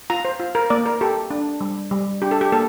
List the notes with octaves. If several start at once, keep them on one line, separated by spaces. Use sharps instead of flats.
F4 A#5
C5
F4
A#4
A#3 D5
A#4
G4 A4
D4
G3
G3
D4 G4
A4
G4
A#3 A4